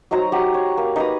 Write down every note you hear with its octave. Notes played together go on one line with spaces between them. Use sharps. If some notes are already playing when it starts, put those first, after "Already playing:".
F#3 D#4 C5 A#5
G4 F#5 C6
C#5
A#3
D#4 B4 A#5 D#6